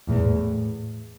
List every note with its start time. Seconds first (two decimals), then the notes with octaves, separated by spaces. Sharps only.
0.08 E2 A2
0.16 G#2
0.24 A2